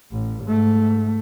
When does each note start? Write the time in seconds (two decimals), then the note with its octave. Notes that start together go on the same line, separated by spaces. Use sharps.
0.11 A1
0.44 G#2 A3